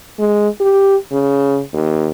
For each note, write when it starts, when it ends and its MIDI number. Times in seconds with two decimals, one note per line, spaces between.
0.19 0.48 56
0.60 0.96 67
1.12 1.61 49
1.73 2.10 39